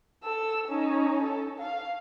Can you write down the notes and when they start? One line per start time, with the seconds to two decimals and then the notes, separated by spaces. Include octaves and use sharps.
0.24 A4 E6
0.68 C#4 D#4
1.23 A4
1.59 F5